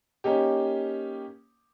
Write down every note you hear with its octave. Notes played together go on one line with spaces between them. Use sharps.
A#3 C#4 D#4 G4